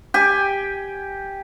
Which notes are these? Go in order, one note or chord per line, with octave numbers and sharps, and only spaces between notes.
G4 G#5